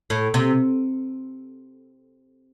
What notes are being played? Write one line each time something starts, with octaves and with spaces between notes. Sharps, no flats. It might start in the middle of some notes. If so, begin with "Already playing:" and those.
A2
C3